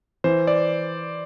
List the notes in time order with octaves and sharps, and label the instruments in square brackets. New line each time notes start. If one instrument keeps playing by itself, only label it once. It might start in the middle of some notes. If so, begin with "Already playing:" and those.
[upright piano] E3 [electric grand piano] C5
[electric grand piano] D5